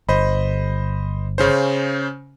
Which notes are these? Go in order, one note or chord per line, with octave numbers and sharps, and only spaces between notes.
G1 C5 D#5 B5
C#3 C#4 C5